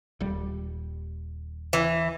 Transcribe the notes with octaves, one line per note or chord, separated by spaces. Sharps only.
D#1 G3
E3